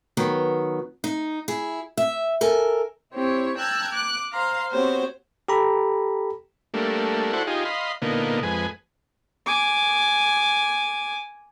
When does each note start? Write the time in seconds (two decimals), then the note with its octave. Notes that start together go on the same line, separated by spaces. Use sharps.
0.17 D#3 F#3 B3
1.04 D#4
1.48 E4 G#4
1.97 E5
2.41 A4 A#4 G#5
3.14 C4 E4 G4 C#5
3.57 G5 A5 A#5 E6 F#6 G#6
3.91 D6 F#6
4.31 C5 F5 A#5 C6
4.71 B3 C4 F#4 G4 C5 C#5
5.49 G4 A4 A#5 B5
6.74 G3 A3 A#3 D4
7.33 E4 F#4 A4 C5 D5 F#5
7.47 D#4 F4 G4 G#4
7.65 D#5 F5 B5 C6
8.02 A#2 D3 A#3 B3 D#4
8.43 F2 G#3 B4 G#5
9.46 G#5 D6